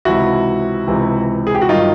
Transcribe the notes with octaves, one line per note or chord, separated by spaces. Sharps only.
C#2 C3 E3 E4 F#4
C#2 C3 E3
G#4
G4
F#4
G2 D#3 F#3 D#4 F4